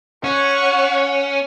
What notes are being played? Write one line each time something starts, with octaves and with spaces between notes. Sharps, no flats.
C#4 F#5 C#6